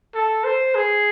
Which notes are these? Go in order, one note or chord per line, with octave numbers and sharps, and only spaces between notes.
A4
C5
G#4